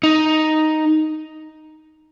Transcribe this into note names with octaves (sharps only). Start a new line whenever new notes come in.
D#4